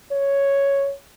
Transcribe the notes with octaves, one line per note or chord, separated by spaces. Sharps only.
C#5